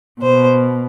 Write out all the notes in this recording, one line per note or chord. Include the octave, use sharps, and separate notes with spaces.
B2 C5